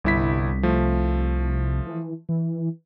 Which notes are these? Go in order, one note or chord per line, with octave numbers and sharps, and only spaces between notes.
G1 C2 E4 B6
F3 A3
E3
E3